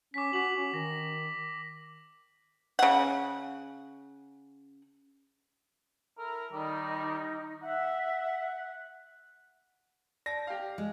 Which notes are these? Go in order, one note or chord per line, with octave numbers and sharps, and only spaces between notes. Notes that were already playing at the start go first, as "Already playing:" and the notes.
C#4 D6 B6
F#4 B6 F#7
C#4
D#3 A#6
C#3 F#5
E4 A4 A#4
D#3 G3 D#4
E5 F#5
D5 A5 A#6
G4 F5
G#3